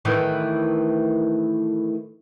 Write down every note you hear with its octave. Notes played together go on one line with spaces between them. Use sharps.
A2 D#3 E3